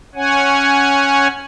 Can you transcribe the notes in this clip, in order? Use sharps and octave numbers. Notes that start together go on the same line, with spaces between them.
C#4 C#5 F#5 G#5